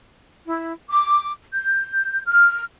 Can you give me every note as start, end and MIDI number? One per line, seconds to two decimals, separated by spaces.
0.46 0.72 64
0.90 1.32 86
1.53 2.23 91
2.26 2.62 89